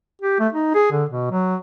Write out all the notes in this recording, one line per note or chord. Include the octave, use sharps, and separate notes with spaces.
G4
A3
D#4
G#4
D3
B2
F#3